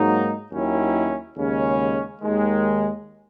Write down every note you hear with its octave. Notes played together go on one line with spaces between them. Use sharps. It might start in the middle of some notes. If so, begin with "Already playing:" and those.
Already playing: G#2 F#3 A#3 D#4
D#2 D#3 F#3 C#4 E4
D#2 C#3 G#3 C#4
D#2 D#3 G#3